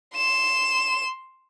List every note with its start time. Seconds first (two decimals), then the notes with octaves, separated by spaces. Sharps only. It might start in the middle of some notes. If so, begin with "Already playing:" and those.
0.16 C6 E7